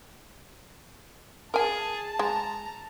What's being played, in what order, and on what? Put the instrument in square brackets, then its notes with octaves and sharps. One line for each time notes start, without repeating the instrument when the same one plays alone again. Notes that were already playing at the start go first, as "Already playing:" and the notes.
[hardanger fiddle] G#4 [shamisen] A#4 G#5 [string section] A5
[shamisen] G#3 [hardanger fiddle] A#5